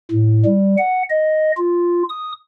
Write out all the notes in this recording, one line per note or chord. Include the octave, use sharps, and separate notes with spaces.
A2
G3
F#5
D#5
F4
D#6